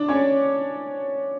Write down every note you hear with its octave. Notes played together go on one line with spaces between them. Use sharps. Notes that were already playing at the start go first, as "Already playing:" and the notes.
Already playing: D4 D5
C#4 C#5